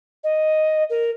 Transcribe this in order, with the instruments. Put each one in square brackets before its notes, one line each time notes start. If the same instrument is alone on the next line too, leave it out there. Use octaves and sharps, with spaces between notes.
[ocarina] D#5
A#4